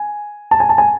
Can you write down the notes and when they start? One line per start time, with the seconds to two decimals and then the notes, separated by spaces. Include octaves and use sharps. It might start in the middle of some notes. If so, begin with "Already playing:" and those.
Already playing: G#5
0.51 A5
0.60 G#5
0.69 A5
0.78 G#5